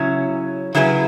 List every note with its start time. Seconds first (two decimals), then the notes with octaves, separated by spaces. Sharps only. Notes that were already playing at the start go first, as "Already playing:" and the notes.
Already playing: C#3 F#3 C#4 E4
0.74 C#3 F#3 E4 G#4 B4